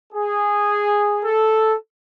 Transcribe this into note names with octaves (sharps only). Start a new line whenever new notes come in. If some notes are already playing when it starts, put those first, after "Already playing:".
G#4
A4